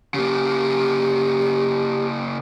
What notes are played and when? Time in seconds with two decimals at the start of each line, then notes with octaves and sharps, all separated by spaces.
0.14 C#3 A#3 G4